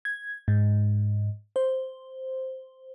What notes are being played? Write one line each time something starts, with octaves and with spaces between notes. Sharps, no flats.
G#6
G#2
C5